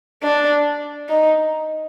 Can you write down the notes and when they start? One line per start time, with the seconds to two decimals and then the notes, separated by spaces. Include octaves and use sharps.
0.23 D4
1.09 D#4